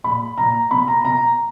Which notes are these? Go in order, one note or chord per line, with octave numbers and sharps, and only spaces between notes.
A#2 B5
A#2 A#5
B2 B5
A#5
B2 A#5